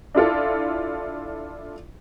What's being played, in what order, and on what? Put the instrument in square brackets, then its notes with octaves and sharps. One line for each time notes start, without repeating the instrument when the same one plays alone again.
[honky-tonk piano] D4 E4 F4 A4